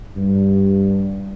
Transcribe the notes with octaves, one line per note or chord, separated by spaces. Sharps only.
G2